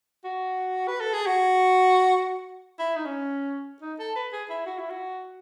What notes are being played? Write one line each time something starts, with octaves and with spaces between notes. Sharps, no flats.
F#4
B4
A4
G#4
F#4
E4
D#4
C#4
D#4
A4
B4
G#4
E4
F#4
E4
F#4